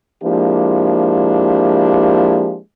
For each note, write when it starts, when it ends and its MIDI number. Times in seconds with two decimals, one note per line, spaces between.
0.24 2.58 53
0.24 2.58 56
0.24 2.58 58
0.24 2.58 62
0.24 2.58 64
0.24 2.58 67